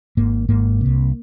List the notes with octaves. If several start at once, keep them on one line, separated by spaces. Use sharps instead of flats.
G#1 G#2 A#3
G#1 G#2 A#3
C2 C3